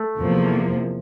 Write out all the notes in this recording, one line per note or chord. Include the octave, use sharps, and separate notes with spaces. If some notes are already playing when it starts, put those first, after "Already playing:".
Already playing: A3
E2 C3 F3 A#3